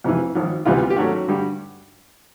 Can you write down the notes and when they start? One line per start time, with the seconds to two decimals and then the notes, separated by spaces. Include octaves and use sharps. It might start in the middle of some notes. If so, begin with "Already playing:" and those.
0.04 F2 C3 E3
0.35 G#1 G#2 F3
0.65 D2 C3 E3 G3 B3 F4
0.90 G4
0.96 G#2 D#3 F#3 A3 C#4 F#4
1.28 G2 D3 G3